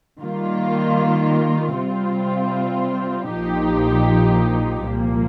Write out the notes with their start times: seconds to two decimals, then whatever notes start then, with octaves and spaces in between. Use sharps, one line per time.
0.20 D#3 G3 A#3 F4
1.75 C3 G3 C4 F4
3.32 A#1 A#2 F3 D#4 G4
4.88 C2 A#2 F3 A#3